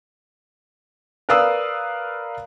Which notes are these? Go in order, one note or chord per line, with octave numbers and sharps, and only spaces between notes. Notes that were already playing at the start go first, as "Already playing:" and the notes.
A#4 B4 D5 F5 D#6 E6